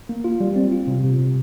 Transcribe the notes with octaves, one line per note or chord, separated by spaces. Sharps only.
A#3
F4
G3
C4
F4
C3
C3
C3